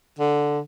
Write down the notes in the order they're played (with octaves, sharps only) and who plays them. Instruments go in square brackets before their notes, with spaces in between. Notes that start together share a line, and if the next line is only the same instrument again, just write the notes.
[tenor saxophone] D3